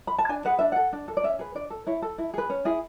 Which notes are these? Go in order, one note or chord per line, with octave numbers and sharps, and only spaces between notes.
B5
A5
D4 G#5
G#4 B4 F#5
D4 E5
A4 F#5
D4
A4
D5
C#4 E5
G#4 B4
D4 D5
A4
E4 C#5
A4
E4
G#4 B4
C#4
E4 G#4